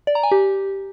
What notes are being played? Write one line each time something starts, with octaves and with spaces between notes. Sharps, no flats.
D5
A#5
G#5
G4